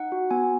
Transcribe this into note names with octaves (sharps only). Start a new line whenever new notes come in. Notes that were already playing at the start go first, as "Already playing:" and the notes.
Already playing: D#4 F#5
F#4
B3 G#5